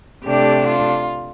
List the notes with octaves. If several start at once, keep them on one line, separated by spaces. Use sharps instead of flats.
C3 A3 D4 G4
F4